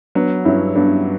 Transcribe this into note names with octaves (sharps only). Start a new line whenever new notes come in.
F#3 B3 D4
G2 C#4 E4
G2 B3 D4